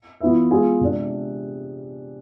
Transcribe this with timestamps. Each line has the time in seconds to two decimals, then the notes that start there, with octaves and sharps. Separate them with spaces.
0.20 E3 B3 F4 B4 E5
0.51 G#3 B3 F4 G#4
0.81 C3 G#3 D4